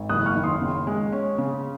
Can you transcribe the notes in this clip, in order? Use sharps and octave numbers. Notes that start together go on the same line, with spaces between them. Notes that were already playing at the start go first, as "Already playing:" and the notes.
Already playing: G#1
F#1 D#6 F#6
C#6 F6
D#3
C6 D#6
C#3
G#3
C#4
C#3